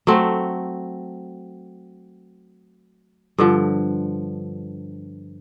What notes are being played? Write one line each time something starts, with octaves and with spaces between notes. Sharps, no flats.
F#3 A3 C4
G2 D3 F3